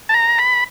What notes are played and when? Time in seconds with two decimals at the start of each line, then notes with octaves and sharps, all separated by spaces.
0.09 A5
0.14 A#5
0.39 B5